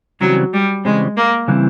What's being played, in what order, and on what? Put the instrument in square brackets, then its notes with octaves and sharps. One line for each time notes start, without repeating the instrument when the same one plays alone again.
[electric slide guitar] C#3 E3 G3 C4 [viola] F#3
[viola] G3
[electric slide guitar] C#3 E3 G3 C4 [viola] G#3
[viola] A#3
[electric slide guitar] C#3 E3 G3 C4 E4